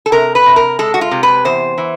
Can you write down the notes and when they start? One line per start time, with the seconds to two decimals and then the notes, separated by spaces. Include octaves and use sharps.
0.06 A4
0.12 C3 A#4
0.35 B4
0.46 C3
0.56 A#4
0.79 G#3 A4
0.94 F#4
1.01 F4
1.11 C3
1.23 B4
1.45 E2 C5
1.78 E3